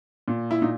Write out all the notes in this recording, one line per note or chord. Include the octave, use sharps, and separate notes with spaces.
A#2
E4
A#2 D#4